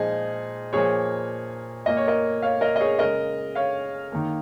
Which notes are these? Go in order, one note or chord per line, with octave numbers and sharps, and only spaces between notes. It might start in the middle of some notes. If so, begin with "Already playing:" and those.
Already playing: A#2 F3 G#3 D#4 G#4
A#2 F3 A#3 G#4 C#5
A#2 A#3 D#5
C#5
A#4 D#5
C#5 F5
A#4 D#5
D#5
G#4 C#5
C#3 G#3 A#4 D#5
C#5 F5
D#3 A#3